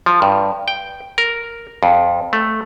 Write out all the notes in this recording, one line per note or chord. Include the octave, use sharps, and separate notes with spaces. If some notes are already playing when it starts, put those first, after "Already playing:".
F3
G2
G5
A#4
F2
A3